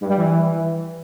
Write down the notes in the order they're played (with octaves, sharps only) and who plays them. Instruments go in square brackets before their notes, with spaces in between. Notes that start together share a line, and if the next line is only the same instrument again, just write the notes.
[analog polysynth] G2
G3
E3